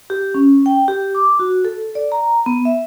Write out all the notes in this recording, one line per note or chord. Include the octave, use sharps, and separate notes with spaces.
G4
C#4
G5
G4
D6
F#4
A4
D5
A#5
B3
E5